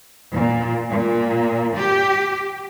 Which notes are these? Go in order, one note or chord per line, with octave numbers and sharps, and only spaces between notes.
A#2
A#2
G4